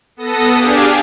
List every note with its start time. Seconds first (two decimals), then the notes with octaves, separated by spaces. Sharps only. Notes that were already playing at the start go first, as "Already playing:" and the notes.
0.17 B3 A4 D#6 A#6
0.56 D4 G4 G#4 D5 F5 G#5